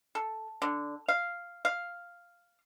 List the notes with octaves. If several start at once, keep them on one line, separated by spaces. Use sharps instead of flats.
A4
D3
F5
F5